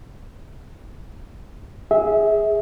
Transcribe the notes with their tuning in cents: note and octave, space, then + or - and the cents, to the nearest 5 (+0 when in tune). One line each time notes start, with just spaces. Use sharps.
G#4 +0 E5 -25